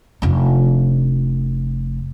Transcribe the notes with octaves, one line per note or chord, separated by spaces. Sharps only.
F1 D4